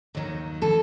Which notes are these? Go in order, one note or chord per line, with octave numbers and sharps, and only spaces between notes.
D#2 D#3 F#3
E3 A4